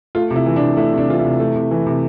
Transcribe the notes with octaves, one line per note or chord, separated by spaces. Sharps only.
A3 F4
C3
E4
E3
D4
C3
A3 E4
C3
D4
E3 F4
E4
C3
A3
C3
E3
C3